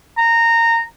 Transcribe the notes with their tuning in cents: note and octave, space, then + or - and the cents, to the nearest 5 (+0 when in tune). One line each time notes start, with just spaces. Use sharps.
A#5 -15